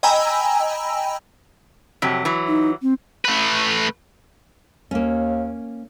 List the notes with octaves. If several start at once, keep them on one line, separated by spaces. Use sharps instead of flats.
D#5 G5 G#5 A#5 B5 E6
F2 C3 F#3
E3 F#3
D#4
C4
A3 B4
D#2 A#3 C#4